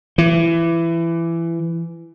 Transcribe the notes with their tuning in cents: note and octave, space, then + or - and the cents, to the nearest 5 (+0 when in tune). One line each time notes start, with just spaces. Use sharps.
E3 +20